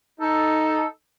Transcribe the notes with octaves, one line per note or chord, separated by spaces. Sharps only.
D#4 A4